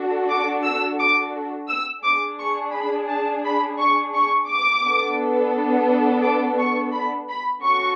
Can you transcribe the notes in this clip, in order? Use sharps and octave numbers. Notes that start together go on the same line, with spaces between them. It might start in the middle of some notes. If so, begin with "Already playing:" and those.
Already playing: D4 F#4 A4
D6
E6
D6
E6
D4 G#4 D6
C#6
B5
A5
B5
C#6
C#6
D6
B3 D4 A4
D6
C#6
B5
B5
C#4 F#4 A4 C#6